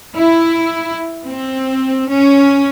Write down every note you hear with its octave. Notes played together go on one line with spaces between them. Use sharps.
E4
C4
C#4